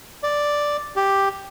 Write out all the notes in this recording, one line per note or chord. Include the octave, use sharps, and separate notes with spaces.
D5
G4